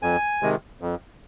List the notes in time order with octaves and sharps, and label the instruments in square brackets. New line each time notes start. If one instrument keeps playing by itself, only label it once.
[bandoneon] F2 G#5
C3 D#3 G#3
F2